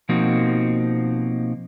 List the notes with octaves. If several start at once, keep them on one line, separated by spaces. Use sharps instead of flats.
B2 F3 A#3 C4 D#4 F#4